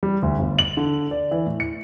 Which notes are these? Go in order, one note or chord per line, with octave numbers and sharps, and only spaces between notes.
G3
D2
G1
F#7
D3
D5
E3
A2
C#7